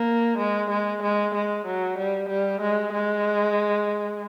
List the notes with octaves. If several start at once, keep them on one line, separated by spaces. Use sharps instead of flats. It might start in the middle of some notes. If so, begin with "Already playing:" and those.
Already playing: A#3
G#3
G#3
G#3
G#3
F#3
G3
G3
G#3
G#3